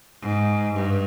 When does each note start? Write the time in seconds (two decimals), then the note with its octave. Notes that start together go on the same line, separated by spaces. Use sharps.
0.22 G#2
0.74 G2